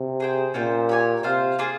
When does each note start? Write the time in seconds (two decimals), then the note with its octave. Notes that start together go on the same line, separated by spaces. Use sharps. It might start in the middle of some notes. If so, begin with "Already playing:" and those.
Already playing: C3
0.20 G#4 C5 G5
0.54 A#2 C#4 F4 C5 G5
0.89 G4 C#5 G#5
1.23 C3 F4 C5 F5
1.59 A#3 F4 G#4